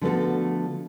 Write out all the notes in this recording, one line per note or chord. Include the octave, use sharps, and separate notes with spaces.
D3 F3 A3 B3 F#4 A4